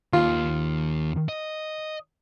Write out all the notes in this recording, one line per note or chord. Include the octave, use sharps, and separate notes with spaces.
D#2 F4
D#5